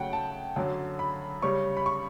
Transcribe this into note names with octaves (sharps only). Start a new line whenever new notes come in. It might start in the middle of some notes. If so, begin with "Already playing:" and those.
Already playing: C#3 F#3 A3 F#5 G5
A5
F#2 D3 F#3 C#4
B5
C#3 G3 C#4 C#6
B5
C#6